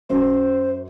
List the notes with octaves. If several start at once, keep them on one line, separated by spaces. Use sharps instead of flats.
F#2 C5